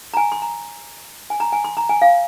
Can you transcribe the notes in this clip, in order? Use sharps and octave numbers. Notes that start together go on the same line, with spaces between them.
A#5
G#5
C6
A#5
G#5
A#5
G#5
C6
A#5
G#5
F5